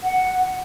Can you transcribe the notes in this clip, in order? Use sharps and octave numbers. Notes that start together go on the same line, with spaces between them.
F#5